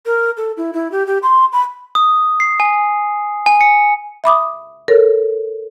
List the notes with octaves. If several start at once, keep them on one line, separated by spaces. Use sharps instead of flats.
A#4
A4
E4
E4
G4
G4
C6
B5
D#6
C7
G#5
G#5
C#7
E5 B5 D6 D#6
A4 A#4 C#5